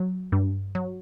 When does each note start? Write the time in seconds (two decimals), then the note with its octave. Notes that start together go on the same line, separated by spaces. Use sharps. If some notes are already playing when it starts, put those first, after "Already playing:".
Already playing: F#3
0.32 G2
0.75 F#3